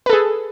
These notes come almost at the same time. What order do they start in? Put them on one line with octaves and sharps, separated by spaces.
B4 A4 G#4